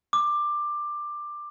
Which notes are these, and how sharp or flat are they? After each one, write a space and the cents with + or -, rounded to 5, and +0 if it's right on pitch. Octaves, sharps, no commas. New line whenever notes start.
D6 +15